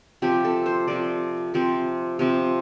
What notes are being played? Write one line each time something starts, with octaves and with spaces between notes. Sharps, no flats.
C3 F3 C4 G4
A4
C5
C3 F3 C4 D5
C3 F3 C4
C3 F3 C4